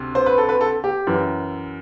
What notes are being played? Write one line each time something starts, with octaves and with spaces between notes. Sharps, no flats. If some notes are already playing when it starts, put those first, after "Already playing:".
Already playing: D2 C3
C5
B4
A4
B4
A4
G4
F#2 E3